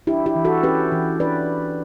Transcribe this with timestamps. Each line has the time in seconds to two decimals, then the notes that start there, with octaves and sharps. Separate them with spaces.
0.07 D4 E4 G4
0.26 E4 G4
0.35 E3
0.45 F#4 A4
0.63 C#4 G4 B4
0.92 E3
1.20 D4 B4 D5